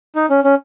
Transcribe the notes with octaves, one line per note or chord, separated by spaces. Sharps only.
D#4
C#4
C#4